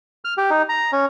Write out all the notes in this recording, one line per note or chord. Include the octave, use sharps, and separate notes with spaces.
F6
G4
D#4
A#5
C#4